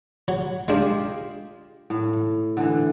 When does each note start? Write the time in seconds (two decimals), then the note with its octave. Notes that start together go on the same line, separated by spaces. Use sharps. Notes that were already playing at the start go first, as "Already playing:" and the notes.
0.28 F#3
0.68 G#3 D4 F4 G4 D#5
1.90 A2
2.57 D3 E3